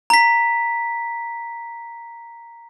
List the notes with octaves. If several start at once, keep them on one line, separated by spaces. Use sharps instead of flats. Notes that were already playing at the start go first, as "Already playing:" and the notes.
A#5 B6